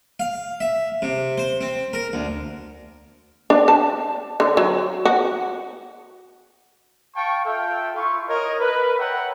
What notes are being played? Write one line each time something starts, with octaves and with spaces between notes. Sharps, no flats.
F5
E5
C3
C5
C4
A#4
D2
D4
A5
D3
F#3
F#4
F5 G5 A5 C#6
F4 A4 E5 F5 G5
E4 F4 C#6
A#4 C#5 D#5
A#4 B4
C#5 E5 F#5 G5 A#5